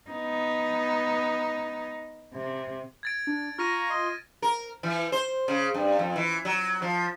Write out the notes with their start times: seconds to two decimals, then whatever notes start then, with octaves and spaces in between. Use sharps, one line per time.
0.10 B3 D#4
2.34 C3
3.03 G#6 A6 D7
3.27 D4
3.58 F4 A#5 C#6 F6 A#6 D#7
3.90 D#5 C6
4.42 A#4
4.83 E3
5.12 C5
5.48 C#3
5.74 G2
5.99 F2
6.16 E3
6.45 F#3
6.82 F3